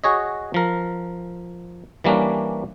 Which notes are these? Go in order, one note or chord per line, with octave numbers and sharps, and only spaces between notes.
F#4 G#4 C#5 D#5
F3 A#4
E3 G3 A#3 C#4 D4